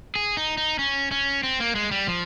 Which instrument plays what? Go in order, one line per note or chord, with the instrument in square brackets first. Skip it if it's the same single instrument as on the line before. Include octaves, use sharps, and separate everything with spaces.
[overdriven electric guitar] G#4
D#4
D#4
C#4
C#4
C4
A#3
G#3
G3
F3